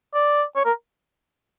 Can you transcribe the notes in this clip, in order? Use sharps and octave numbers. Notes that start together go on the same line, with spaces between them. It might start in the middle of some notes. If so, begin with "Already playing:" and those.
D5
C#5
A#4